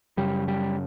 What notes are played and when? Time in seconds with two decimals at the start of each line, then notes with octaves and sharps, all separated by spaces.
0.17 F#2 C#3 G3
0.48 G3